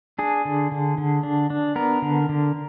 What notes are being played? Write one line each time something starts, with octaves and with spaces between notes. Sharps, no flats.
D4 G#4
D3
D3
D3
D4
D4
B3 A#4
D3
D3